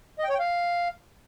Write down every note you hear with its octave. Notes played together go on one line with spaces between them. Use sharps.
D#5
G5
C#5
G5
F5